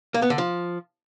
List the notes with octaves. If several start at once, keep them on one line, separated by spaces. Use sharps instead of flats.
A#3
B3
D3
F3